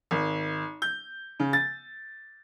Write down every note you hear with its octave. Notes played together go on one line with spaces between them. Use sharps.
G#1
G6
C#3
A6